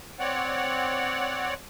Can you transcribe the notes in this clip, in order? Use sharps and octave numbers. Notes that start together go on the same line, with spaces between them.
C4 C#5 D5 F#5